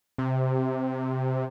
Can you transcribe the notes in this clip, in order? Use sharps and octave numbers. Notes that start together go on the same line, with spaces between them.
C3